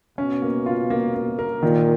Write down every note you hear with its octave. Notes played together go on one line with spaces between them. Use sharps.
B2 C#4
A#3
F4
A#3
A#3
A#4
A#2 D#3